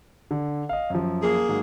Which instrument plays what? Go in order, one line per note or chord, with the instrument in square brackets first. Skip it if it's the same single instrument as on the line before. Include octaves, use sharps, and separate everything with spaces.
[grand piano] D3
D#5 F5
F#2 F3
[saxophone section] A#3 G#4
[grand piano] G#2 F#3